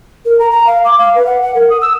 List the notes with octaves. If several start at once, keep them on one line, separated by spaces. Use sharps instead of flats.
A#4
A#5
A#5
F5
D6
F5
B4
F#5
F#5
A#4
D#6
E6